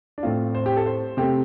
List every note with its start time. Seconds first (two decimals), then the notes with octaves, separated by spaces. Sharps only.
0.18 D4
0.23 A2 A3 C4 F4
0.55 C5
0.66 G4
0.77 A4
0.86 C5
1.17 C3 A3 C4 G4